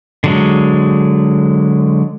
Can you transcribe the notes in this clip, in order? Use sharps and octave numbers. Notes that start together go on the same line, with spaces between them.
D3 F#3 G#3